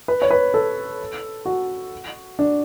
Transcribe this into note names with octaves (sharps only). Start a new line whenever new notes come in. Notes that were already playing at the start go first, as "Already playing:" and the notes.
B4
C#5
B4
A4
F#4
D4